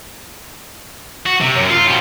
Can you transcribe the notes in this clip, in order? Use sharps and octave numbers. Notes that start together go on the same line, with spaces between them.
F#4
C3
F#2
F4
B2 C4